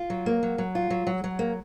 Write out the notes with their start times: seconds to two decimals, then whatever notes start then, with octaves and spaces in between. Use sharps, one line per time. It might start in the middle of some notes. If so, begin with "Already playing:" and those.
Already playing: F4
0.10 F#3
0.26 A#3
0.43 F#3
0.58 F#3
0.75 F4
0.90 F#3
1.07 F#3
1.24 F#3
1.39 A#3